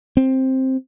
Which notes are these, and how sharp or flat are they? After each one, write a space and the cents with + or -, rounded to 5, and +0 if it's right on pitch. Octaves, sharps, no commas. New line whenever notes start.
C4 +10